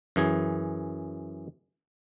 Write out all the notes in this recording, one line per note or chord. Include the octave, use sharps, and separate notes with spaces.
F#2 E3 G#4 G#5